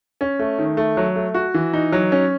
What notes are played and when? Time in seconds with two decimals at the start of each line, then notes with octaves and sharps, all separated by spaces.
0.21 C#4
0.39 A3
0.59 D#3
0.77 A3
0.97 F#3
1.16 A3
1.34 F#4
1.54 E3
1.73 D#4
1.92 F#3
2.12 C#4